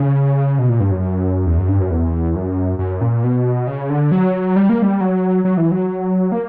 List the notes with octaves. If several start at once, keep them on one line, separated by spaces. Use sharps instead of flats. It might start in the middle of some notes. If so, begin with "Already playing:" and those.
Already playing: C#3
B2
A#2
G2
F#2
E2
F#2
G2
F#2
E2
F#2
F#2
A#2
B2
C#3
D3
F#3
G3
A#3
G3
F#3
F#3
E3
F#3
A#3